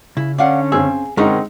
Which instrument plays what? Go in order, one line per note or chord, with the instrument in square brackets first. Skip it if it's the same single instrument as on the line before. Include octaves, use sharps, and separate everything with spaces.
[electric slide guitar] C#3 [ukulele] E4
[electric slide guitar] D3 [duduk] C#4 [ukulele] D4 F5 F#5
[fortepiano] C#3 C4 E6 [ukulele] G#4
[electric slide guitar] D3 A#4 F#5 [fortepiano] G#3 D#4 [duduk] C4 [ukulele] C#4 A#5